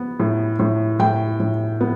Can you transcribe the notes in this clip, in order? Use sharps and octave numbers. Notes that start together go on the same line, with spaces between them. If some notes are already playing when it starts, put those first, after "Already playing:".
Already playing: B3
A2
A2
A2 G5
A2
B3